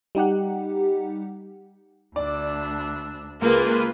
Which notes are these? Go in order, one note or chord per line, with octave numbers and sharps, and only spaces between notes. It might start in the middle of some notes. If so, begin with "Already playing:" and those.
G3 D#4 G4 F#5
D2 D4 D5 E6
C#2 A#3 F4 G#4 B4